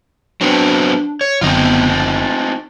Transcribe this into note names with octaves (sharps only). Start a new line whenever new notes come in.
F#3 B3 C4 D4
C#5
F#1 D3 B3 C4 D#4 F4
A6